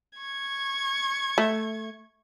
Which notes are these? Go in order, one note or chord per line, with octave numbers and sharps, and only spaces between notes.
C#6 G#6
A3